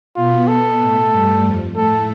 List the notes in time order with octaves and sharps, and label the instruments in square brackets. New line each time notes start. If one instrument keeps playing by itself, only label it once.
[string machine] B2 B3 [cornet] F4
[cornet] A4
[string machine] A2 A3
G2 G3
F2 F3
[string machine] A2 A3 [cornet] A4